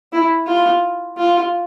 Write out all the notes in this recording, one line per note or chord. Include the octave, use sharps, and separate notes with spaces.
E4
F4
F4